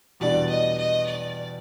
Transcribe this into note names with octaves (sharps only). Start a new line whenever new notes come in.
E2 B2 G3 B3 D4 D5
D#5
D#5
D5